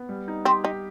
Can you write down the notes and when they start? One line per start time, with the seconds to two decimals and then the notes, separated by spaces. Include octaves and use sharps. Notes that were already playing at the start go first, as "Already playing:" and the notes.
Already playing: B3
0.09 G3
0.28 D#4
0.45 C4 G4
0.64 D#4 G4